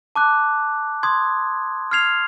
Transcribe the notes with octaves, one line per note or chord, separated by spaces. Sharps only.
A5 D6 F#6
C6 D#6 G#6
F6 G#6 C7 F7